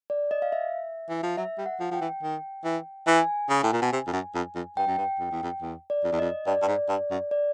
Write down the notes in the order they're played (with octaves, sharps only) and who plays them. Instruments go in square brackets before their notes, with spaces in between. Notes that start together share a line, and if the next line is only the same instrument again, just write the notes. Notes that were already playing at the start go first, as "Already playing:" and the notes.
[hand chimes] D5
D#5
F5
E5
[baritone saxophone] E3
F3
[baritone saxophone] F#3 [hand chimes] E5
[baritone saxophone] G3
[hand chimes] F#5
[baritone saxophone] F3
[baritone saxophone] F3 [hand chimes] G5
[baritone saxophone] E3
D#3
E3
[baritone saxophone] E3 [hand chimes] G#5
[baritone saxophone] C#3
A2
A#2
B2
C3
F2
F#2
F2
F2
[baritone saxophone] G2 [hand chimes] G5
[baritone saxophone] F#2
G2
F2
E2
F2
E2
[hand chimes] D5
[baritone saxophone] F2
E2
[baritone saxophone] F2 [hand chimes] D#5
[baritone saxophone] G2 [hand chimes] D5
[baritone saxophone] G2
G#2
G2
F#2
[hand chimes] D5